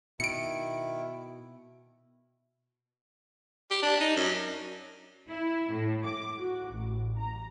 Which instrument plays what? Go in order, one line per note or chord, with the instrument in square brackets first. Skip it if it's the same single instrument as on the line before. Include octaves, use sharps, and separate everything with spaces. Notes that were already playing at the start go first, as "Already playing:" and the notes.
[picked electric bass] B2 [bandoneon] D#3 E4 [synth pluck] C#7 D7
[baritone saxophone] G4
D4
D#4
F#2
[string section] E4
A2
D6
F#4
A1
A#5